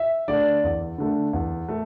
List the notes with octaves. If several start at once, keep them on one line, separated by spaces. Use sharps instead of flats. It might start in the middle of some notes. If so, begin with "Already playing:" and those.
Already playing: E5
D3 A3 D5
E2
D3 A3
E2
A3